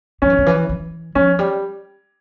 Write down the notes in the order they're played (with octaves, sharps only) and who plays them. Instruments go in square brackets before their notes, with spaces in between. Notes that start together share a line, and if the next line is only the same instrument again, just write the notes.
[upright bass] F3 [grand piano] C#4
[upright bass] E3
C#3
E3
E3
[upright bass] F3 [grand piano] C#4
[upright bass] G3